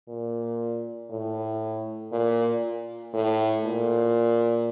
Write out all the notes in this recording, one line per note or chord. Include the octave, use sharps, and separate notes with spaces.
A#2
A2
A#2
A2
A#2